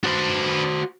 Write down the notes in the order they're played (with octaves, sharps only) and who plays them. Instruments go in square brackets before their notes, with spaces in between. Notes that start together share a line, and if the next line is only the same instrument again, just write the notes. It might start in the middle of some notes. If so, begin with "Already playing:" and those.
[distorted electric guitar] D4 B4 [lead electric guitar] F#4 C5